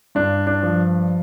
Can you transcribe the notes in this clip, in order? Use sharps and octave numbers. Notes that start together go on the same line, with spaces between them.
G2 D4
D4
F3